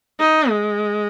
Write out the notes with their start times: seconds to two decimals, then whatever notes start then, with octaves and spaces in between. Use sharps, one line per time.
0.20 D#4
0.49 G#3